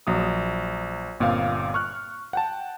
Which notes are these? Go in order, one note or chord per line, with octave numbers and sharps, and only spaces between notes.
A#1 F#3 D#6
G1 A#2 C4 F5
C#6 F6 F#6
F#5 G5 A5